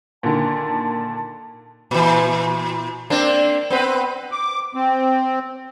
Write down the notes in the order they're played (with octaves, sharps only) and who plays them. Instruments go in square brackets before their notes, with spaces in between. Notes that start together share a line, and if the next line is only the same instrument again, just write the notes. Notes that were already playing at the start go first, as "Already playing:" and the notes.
[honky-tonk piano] A#2 D3 D#3 [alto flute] A5
[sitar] A#2 E3
A#3 C4 D4
B3 C4 B4
[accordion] D6
C4